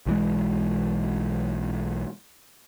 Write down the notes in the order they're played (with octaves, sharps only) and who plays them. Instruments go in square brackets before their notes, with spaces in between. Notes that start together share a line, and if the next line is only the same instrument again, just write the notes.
[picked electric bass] B1 E3 G#3